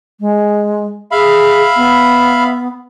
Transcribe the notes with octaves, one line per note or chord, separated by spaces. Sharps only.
G#3
G#4 E5 F5 B5
B3